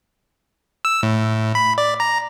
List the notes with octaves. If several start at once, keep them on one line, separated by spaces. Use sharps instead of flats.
E6
A2
B5
D5
A#5